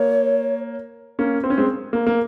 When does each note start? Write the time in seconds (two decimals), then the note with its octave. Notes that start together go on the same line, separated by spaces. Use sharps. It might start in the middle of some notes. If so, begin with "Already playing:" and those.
Already playing: A#3 C#5
1.19 A#3 C#4
1.44 C4
1.50 C#4
1.58 G#3 C4
1.93 A#3
2.07 A#3